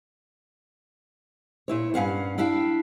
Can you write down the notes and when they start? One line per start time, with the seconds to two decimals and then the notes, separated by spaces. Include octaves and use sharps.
1.68 A#2 E4 C#5
1.94 G2 C#4 F5 F#5
2.38 D4 E4 E5 F5 G5